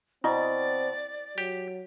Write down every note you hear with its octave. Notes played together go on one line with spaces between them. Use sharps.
B2 C4 E4 D5 D#5
F#3 G4